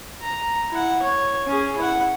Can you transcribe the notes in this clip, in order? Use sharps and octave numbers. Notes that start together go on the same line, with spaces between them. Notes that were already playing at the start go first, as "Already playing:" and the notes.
A#5
E4 F#5
C#5
C#4 G#4
E4 F#5